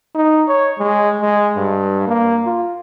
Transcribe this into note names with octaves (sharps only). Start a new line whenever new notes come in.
D#4
C#5
G#3
G#3
G2
A#3
F4